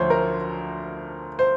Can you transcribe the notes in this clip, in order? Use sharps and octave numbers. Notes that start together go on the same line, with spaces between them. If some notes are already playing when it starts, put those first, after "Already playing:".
Already playing: D2 D3 F3 C5 C#5
A#4
C5